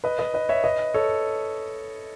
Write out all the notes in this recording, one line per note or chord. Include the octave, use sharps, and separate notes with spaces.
B4 D#5
B4 D#5
B4 D#5
C#5 E5
B4 D#5
A4 C#5